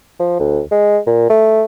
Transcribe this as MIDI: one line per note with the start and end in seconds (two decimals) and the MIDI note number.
0.20 0.35 53
0.39 0.60 38
0.71 0.99 56
1.07 1.25 46
1.30 1.64 57